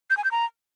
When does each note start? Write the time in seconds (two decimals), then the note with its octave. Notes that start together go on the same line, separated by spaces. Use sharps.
0.10 G6
0.17 G#5
0.24 G6
0.31 A#5